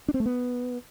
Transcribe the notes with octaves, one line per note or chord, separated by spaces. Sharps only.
D4
C4
A3
B3